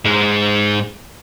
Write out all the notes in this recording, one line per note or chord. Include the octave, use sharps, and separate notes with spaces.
G#2 G#3